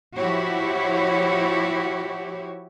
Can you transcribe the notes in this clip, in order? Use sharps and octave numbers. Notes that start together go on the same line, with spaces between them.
F3 E4 F#4 G4 C#5